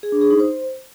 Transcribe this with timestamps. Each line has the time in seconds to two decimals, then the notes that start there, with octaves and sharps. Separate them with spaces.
0.03 G#4
0.12 D4
0.21 G#4
0.30 D#4
0.40 C5